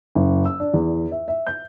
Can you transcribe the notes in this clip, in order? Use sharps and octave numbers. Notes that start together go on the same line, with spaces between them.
F#1
E6
D4
E2
E5
E5
G6